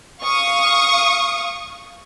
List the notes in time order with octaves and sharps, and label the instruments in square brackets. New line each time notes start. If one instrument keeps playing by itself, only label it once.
[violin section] F5 C#6 D#6